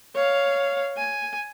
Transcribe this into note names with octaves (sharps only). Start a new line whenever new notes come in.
C#5 F5
G#5